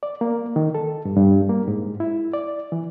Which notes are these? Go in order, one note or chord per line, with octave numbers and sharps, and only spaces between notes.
D5
A#3
D#3
A4
G2
G2
A#3
G#2
E4
D5
E3